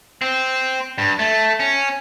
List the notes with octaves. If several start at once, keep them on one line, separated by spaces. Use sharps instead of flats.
C4
G2
A3
C#4